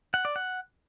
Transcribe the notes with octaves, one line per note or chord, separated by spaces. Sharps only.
F#5
D5
F#5